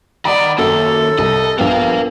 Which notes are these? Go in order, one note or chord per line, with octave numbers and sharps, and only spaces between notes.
D#3 D5 D#5 F#5 A#5 B5
F#2 D#3 A#3 A4
C2 D#5
A#1 G2 B3 A#4 F5 G5